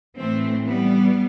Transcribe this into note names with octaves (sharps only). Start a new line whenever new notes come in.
A2 E3 A3 C4
G3 B3